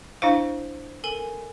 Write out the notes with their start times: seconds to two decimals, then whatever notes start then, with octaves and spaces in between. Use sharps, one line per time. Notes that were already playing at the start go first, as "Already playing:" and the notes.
0.22 D4 E4 C5 F5
1.04 A4 A#4 G#5